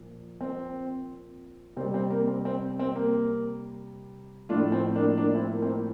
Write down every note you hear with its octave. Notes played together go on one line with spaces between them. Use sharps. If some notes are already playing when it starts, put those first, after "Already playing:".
Already playing: A#2 F3
C4
C3 G3 C4
C4
A#3
C4
C4
C4
A#3
A2 F3 A3 D4 F4
C4
A#3 D4
A#3 D4
C4 E4
A#3
C4
A#3